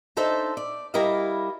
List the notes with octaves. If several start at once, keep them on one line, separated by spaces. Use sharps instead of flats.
D4 D#4 A4 C5 E5
D5
G3 E4 A#4 D5 D#5 F5